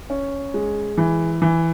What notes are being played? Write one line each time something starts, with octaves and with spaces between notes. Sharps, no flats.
C#4
G#3
E3
E3